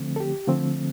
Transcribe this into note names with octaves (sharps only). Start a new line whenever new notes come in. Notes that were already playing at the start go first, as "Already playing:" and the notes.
Already playing: D3 F3 A3 C4
A4
G4
D3 F3 A3 C4